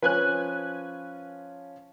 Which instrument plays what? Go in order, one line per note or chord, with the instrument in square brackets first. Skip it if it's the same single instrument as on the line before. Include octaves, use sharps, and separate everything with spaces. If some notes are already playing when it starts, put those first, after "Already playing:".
[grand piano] F3 C#4 F4 [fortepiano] B4 G#5 F#6